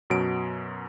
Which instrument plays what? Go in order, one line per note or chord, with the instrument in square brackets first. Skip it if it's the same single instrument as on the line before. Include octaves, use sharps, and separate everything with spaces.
[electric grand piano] F#2 B2 F#3 D7